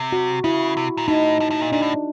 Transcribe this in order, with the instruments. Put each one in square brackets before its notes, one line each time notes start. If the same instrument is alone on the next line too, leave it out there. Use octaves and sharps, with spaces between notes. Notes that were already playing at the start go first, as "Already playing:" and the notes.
Already playing: [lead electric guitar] C3
[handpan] F#4
[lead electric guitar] C#3 [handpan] E4
[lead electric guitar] C3
A#2
[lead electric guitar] A2 [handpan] D#4
[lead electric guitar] A2
A2
A#2
[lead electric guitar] A#2 [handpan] D4
[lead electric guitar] A2